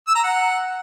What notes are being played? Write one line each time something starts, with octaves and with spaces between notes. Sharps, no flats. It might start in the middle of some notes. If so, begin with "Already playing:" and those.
E6
A#5
F#5